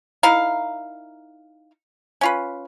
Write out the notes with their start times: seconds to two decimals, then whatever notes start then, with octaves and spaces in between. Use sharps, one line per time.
0.23 D#4 E4 A#4 F5
2.21 C#4 F4 B4